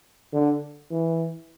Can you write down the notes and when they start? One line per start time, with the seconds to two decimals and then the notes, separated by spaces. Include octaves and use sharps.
0.33 D3
0.91 E3